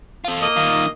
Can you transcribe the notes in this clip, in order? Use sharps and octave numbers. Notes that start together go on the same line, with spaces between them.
F4 A4
A#3 D#5 D#6
D#3 F4